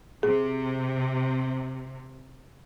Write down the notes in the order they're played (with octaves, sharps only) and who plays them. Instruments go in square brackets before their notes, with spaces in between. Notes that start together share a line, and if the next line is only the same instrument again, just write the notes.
[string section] C3 [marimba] G#4